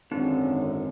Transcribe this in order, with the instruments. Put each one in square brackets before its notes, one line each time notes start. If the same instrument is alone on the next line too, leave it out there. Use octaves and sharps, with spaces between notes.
[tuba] G#1 [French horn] F#2 [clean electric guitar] D3 [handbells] C4